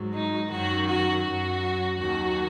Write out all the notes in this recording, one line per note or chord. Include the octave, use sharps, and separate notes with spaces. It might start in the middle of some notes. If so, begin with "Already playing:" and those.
Already playing: G#2 F#3
D#4
F#2 D#3 F#3 F#4
F#4
F#2 F#3 F#4
D#2 D#3 F#3 F#4